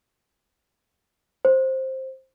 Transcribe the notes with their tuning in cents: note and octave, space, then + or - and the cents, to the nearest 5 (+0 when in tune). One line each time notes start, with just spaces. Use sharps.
C5 +10